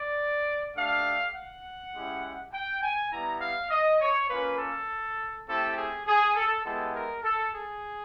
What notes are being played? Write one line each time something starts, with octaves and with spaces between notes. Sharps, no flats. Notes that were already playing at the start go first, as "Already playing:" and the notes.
Already playing: D5
A3 D4 G4 F5
F#5
G#3 C#4 E4 G4
G5
G#5
G3 B3 E4 A#5
F5
D#5
C#5
A#3 C#4 F4 B4
A4
A3 C4 E4 G4 A4
G#4
G#4
A4
G#3 B3 E4 G4 A4
A#4
A4
G#4